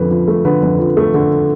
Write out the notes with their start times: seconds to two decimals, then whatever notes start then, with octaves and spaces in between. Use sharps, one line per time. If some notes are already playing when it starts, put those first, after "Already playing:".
Already playing: F2 D3 F3 A3 B4
0.11 F3
0.28 A3
0.45 D3 B4
0.63 F2
0.79 F3
0.97 A3
1.14 D3